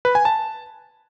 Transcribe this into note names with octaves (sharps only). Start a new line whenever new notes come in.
B4
G#5
A5